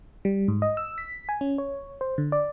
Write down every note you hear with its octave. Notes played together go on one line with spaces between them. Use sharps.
G3
G#2
D#5
E6
B6
G#5
C#4
C#5
C5
D3
D5